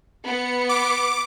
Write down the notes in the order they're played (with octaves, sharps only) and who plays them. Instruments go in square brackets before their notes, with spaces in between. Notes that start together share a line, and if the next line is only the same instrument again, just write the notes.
[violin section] B3 C#7
[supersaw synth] D6